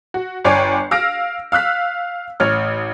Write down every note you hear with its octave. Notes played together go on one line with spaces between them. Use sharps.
F#4
G1 C#5 D5 G5 G#5 C7
F5 E6 F6 A#6 D7
F5 E6 F#6 B6
A1 C#5 F6